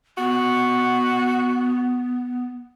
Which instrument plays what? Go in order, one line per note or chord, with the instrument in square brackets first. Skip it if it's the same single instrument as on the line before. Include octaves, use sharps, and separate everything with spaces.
[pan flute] B3 [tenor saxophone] F#4